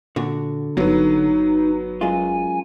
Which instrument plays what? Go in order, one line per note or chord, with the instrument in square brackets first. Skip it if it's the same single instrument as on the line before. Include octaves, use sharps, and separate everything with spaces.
[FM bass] A#2 [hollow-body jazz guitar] D3 F#4
[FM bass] G1 [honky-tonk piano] F#3 B3 [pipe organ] D#4
[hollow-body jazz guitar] F#2 G#3 F4 [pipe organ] G#5